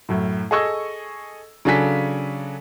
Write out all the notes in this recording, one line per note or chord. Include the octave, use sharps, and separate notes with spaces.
F#2 A2
G#4 A4 D#5 C#6 E6 G#6
C#3 F#3 D4 A4 G#5 B6